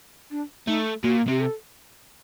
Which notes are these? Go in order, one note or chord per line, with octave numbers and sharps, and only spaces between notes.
D4
A3 D#4
A#2 F#4
C3 G4
A4